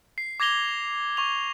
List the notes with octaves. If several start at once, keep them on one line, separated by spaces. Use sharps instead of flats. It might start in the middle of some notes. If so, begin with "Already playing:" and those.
C7
D6 G#6 A#6 F7 G7
C#6 F7